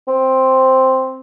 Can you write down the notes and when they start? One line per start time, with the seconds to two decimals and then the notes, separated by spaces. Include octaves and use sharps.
0.07 C4